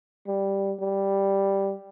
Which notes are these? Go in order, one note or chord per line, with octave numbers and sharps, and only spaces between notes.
G3
G3